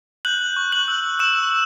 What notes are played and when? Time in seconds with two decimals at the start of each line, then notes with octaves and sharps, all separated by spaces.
0.25 F#6 G6 F#7
0.56 C#6
0.72 F#6 F#7
0.88 E6
1.19 C#6 E6 E7